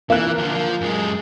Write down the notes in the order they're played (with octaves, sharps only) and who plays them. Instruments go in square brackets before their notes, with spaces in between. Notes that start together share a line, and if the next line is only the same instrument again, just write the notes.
[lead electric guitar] E3 [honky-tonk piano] A#3 F4 F#6
[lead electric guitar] D3 F3
F3
F#2 G#3